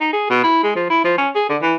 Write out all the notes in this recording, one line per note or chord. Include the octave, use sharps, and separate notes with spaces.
D#4
G#4
B2
E4
G#3
F3
E4
F3
C#4
G#4
D3
E3